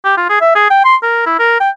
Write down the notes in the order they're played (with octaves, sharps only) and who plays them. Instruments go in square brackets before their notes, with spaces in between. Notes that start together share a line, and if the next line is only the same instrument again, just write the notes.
[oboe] G4
F4
G#4
E5
G#4
G5
C6
A#4
E4
A#4
G5